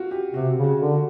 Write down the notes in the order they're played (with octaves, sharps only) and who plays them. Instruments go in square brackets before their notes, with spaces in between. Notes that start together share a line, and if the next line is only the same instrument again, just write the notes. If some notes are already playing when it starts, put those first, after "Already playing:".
Already playing: [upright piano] F4 F#4
G4
[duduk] C3 [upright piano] F#4
[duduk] C#3
[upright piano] F#4
[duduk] D3
[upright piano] F#4